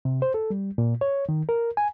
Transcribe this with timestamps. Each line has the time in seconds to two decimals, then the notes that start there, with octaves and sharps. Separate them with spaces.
0.05 C3
0.22 C5
0.34 A4
0.50 G3
0.78 A#2
1.01 C#5
1.29 D#3
1.49 A#4
1.77 G#5